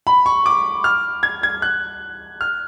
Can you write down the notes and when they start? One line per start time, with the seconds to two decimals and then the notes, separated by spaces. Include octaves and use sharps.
0.07 B5
0.26 C#6
0.46 D6
0.84 F6
1.23 G#6
1.43 G#6
1.62 F#6
2.41 F6